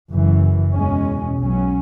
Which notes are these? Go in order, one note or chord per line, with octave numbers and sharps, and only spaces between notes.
F#1 F#2 E3
E2 B2 G#3 C#4
B1 B2 F#3 C#4